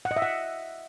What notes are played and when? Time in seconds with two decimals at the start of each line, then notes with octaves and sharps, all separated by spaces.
0.05 F#5
0.11 D#5
0.16 E5
0.22 F#5